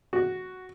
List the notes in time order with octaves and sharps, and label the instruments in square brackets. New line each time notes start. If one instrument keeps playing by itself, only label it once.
[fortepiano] F#4